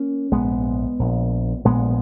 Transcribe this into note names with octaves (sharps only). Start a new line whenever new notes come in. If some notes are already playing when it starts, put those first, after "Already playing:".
Already playing: A#3 C#4
A#1 G#2 G#3 B3
A#1 A#2
A#1 A#2 G#3 B3